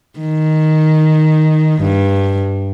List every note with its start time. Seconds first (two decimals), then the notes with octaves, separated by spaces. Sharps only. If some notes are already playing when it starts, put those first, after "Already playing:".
0.19 D#3
1.81 G2